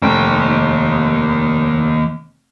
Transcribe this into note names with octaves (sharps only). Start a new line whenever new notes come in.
F1 D#2 G5